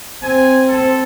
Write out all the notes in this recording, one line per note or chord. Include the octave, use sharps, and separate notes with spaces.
C4 G#5
A4